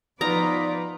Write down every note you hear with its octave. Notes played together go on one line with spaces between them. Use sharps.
F3 B3 D#4 F4 B4 D5 A#5